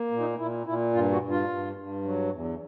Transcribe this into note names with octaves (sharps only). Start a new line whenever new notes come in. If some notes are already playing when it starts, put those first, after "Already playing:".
Already playing: A#3
A#2
D#4
A#2 E4
A#2 E4
G2 F4
F#4
G2
F4
G2
G2
F#3
E2